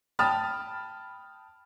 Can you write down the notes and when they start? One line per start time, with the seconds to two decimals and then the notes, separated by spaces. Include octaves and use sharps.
0.19 G5 A5 B5 D#6 F6 A6